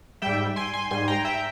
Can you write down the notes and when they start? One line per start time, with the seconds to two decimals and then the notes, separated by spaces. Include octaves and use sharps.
0.22 G#2 G3 E5 G5
0.56 G#5 C6
0.73 G#5 C6
0.91 G#2 G3 G#5 C6
1.08 G5 A#5
1.25 E5 G5